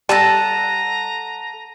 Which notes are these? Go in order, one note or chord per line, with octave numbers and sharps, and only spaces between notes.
G3 A4 F#5 A5 A#5 A#6 D#7